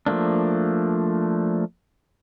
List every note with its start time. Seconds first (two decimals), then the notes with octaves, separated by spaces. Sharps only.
0.06 F3 A3 A#3 D4